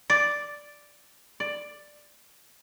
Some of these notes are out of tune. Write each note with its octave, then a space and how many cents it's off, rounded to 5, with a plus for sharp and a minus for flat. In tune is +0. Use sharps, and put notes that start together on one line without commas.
D5 +0
D5 +10